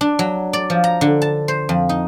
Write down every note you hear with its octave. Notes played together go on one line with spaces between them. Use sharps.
D4
F#3
D5
F3
A#5
D3
A5
C5
F2
D#4